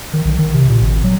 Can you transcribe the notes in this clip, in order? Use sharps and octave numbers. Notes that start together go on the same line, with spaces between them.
D#3
B1
D#3
C3
A#2
G#1
F#3